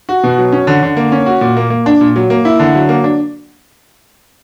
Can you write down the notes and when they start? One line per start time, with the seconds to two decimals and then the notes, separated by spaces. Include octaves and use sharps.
0.09 F#4
0.23 B2
0.38 F#3
0.52 C#4
0.67 D3
0.83 D3
0.97 A#3
1.12 C#4
1.26 F#4
1.41 A#2
1.57 A#3
1.70 A#3
1.86 D4
2.01 A#2
2.16 F#3
2.30 A#3
2.45 E4
2.59 D3
2.75 F#3
2.89 A#3
3.04 D4